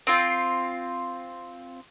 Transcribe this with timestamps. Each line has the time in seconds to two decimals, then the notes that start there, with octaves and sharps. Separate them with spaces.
0.07 C4 F4